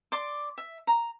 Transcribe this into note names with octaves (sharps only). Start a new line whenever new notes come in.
D5 C6 D6
E5
A#5